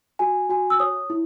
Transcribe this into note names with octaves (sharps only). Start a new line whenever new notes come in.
F#4 G#5
F#4 G#5
E6
C#5 D#6
E4